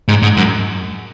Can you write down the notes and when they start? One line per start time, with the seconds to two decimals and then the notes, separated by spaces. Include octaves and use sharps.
0.08 G#2
0.22 G#2
0.37 F#2